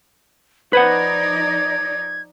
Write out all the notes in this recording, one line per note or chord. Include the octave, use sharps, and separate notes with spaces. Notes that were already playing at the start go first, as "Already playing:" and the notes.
F3 D#4 B4 C5 D5 F#5 G#6